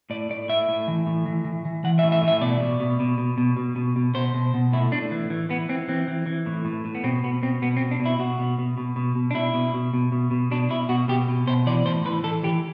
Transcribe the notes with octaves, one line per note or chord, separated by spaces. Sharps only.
A2 D5
A2 D5
A2 E5
A2
E3
A2
E3
E3
E3
E3 F#5
E5
A2
E5
A2
E5
B2 D5
B2
B2
B2
B2
B2
B2
B2
B2
B2 C5
B2
B2
A2 E4
A2 D4
E3
E3
E3 B3
E3 C4
E3 C4
E3
E3
A2
A2
A2
B3
B2 C4
B2 B3
B2 C4
B2 B3
C4
B2
D4
B2
E4
B2 F#4
B2
B2
B2
B2
B2
D4
B2 E4
B2
B2
B2
B2
B2
B2 D4
B2 E4
B2 F#4
B2 G4
B2
B2 C5
E3 D5
A2 C5
E3 B4
E3 A4
E3 G4